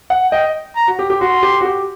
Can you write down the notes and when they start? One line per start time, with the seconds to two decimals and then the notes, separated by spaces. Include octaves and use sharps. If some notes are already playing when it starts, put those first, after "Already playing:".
0.10 F#5
0.32 D#5 G5
0.76 A#5
0.88 F#4
0.99 G4
1.10 G4
1.21 F#4 C6
1.43 G4
1.61 F#4
1.65 G4